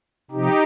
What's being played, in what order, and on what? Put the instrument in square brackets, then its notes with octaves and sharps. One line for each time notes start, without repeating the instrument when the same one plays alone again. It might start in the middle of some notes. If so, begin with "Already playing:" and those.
[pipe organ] C3 F3 D#4 G4